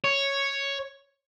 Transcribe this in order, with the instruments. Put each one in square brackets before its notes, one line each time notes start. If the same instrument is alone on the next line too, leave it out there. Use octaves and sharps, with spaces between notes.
[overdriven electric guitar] C#5